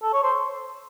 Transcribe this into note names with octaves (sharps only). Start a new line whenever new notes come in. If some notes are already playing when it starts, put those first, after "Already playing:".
A4
C#5
C5